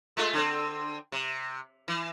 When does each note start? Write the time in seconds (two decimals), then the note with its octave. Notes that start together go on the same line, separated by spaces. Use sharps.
0.17 G#3 A3 F4
0.33 D3 C4
1.12 C3
1.88 E3